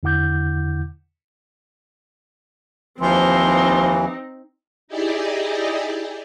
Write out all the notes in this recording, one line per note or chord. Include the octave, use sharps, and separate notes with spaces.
E2 D3 E4 F#5 D6 G6
D#2 E3 F3 C4 D#4 C6
D#4 E4 G4 G#4 D5 D#5